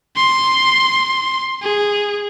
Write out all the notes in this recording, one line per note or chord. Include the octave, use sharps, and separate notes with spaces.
C6
G#4